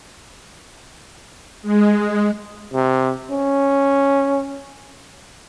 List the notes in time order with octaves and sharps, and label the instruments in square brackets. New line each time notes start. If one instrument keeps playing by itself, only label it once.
[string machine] G#3
[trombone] C3
C#4